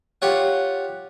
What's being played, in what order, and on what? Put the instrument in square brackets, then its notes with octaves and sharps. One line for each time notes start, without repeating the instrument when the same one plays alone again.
[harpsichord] F4 G4 C#5 F#5